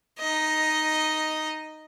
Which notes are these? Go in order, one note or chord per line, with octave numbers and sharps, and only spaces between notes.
D#4 D#5